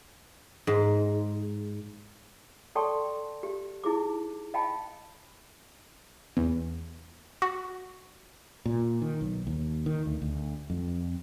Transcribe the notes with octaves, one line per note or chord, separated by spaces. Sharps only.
G#2
A4 D5 G5 A5 C6 C#6
G4
D#4 E4 G#4 D6
D#5 F5 G5 A5 B5
E2
F#4
A#2
D#3
B1
D#2
D#3
D2
D2
F2